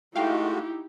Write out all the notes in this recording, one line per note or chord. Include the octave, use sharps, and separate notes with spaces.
G#3 A3 D#4 E4 F#4 G4 F5 G5